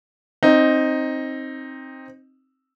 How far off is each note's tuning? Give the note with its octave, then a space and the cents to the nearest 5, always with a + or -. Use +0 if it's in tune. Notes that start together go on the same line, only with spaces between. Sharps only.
C4 +15 D#4 +0